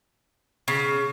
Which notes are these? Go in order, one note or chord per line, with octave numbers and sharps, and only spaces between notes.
C#3